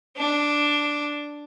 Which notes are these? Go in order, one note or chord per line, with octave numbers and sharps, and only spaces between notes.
D4